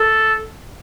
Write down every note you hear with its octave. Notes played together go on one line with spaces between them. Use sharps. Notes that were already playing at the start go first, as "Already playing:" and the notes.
Already playing: A4